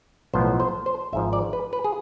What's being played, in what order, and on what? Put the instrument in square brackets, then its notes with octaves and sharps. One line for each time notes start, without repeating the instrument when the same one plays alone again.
[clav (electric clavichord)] B1 A2 F3 B3 C5
C5
C5
G#1 G#2 F3 E5
D5
B4
B4
G#4